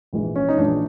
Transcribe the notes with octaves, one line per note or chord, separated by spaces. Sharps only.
A#1 G#2 E3
C#4
D#4
A#1 G#2 E3 D4